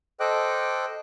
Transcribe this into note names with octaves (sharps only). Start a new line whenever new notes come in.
A4 C5 D#5 G5 D6 F#6